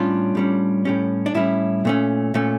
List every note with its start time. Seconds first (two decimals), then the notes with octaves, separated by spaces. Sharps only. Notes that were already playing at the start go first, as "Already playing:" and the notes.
Already playing: A2 G3 C#4 D4 F4
0.35 A2 G3 C#4
0.85 A2 G3 C#4
1.26 D4
1.34 A2 G3 C#4 E4
1.85 A#2 A3 C#4
2.34 A#2 A3 C#4